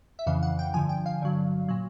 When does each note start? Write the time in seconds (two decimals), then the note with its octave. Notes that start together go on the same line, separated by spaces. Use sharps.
0.19 E5
0.26 F2 C#3 E3 F5
0.43 F#5
0.59 G5
0.74 G2 D3 F3 G#5
0.89 G5
1.06 F5
1.22 G2 D3 F#3
1.69 A#2 F#3